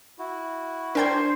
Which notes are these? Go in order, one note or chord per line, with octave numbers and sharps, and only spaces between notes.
E4 F#4
D4 A#4 C5 G5 G#6